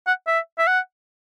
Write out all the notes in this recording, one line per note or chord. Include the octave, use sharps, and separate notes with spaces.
F#5
E5
E5
F#5